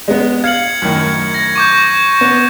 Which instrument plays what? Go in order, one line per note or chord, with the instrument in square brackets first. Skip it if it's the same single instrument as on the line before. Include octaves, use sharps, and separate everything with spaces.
[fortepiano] G#3 B3
[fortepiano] F5 [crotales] G#6 C#7 F#7
[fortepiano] F#2 A2 D#3
[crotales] G#6 A#6
C#6 D6 G6
[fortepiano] B3